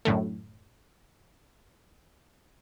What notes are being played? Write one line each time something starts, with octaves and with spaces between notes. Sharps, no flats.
F#2 A2 D3 A3